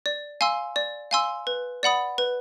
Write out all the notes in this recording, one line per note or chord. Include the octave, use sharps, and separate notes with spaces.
D5
F5 G#5 C6 E6
D5
F5 G#5 C6 E6
B4
D5 F#5 B5 D#6
B4